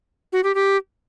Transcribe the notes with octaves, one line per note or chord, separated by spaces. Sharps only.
F#4
G4
G4